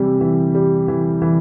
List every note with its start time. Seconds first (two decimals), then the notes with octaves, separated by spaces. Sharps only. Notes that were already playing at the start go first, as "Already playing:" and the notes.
Already playing: C3 E3 G3
0.21 E3
0.55 G3
0.88 E3
1.22 E3